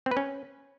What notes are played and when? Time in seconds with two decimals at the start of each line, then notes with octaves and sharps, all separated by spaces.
0.06 C4
0.11 B4
0.17 C#4